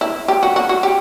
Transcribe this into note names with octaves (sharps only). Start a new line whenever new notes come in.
E4
G4
F#4
F#4
F#4
G4